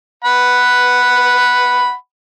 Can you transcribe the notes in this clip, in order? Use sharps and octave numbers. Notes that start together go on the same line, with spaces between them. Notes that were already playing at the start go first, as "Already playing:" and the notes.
F#5 B5